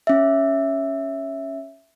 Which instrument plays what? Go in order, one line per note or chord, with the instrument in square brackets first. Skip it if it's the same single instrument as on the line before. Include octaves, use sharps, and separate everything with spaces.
[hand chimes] C#4 E5